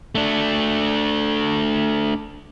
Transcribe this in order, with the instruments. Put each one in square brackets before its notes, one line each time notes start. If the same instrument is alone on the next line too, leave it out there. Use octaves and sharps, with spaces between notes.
[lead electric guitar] A3 D4